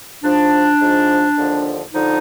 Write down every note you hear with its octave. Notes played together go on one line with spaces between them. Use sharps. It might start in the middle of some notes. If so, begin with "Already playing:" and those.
G#2 F3 D4
G#2 F3
D#2 D3 F3
D3 F3 D#4